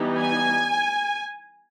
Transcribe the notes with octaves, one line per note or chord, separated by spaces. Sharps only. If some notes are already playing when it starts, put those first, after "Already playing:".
Already playing: E3 G3 B3 D#4
G#5